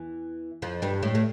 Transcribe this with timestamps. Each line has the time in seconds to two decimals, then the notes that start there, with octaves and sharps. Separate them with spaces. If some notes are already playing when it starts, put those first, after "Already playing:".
Already playing: E2 E3
0.62 F2 F3
0.82 G2 G3
1.03 A2 A3
1.15 A3